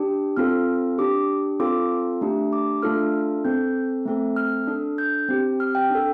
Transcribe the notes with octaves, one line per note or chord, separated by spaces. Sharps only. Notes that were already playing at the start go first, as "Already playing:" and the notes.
Already playing: D4 G4
C4 F4 A4 F6
D4 G4 D6
C4 F4 A4 D6
A3 D4 G4
D6
A3 D4 F4 A4 F6
C4 A4 G6
A3 C4 A4
F6
D4 A4
G6
C4 G4
F6
G5
D4 A4